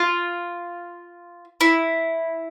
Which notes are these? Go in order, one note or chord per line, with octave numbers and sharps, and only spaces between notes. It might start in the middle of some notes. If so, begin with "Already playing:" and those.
Already playing: F4
E4